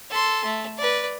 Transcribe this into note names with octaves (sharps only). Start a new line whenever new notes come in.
A4 C6
A3
B4 D5